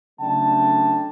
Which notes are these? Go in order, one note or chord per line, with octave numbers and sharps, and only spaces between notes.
C#3 F#3 A3 D4 G5 A5